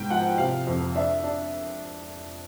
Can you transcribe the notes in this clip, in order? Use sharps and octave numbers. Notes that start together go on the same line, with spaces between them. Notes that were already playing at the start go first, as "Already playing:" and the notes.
Already playing: G#2 B2 G5
F3 F#5
C3 F5
F2
D4 E5
D4